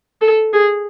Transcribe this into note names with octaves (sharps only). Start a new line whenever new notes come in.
A4
G#4